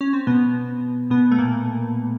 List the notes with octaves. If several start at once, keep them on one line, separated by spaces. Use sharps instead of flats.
C#4
C4
B2 B3
B2 B3
A3
A#2 A#3